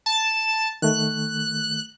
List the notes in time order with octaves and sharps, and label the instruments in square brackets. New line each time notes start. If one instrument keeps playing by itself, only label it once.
[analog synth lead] A5
[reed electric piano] D#3 A3 [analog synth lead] F#6